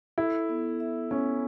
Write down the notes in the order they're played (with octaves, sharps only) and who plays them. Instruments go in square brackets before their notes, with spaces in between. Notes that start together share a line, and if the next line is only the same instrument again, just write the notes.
[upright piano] E4 [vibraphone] A4
[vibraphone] B3
E5
[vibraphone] B3 [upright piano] C#4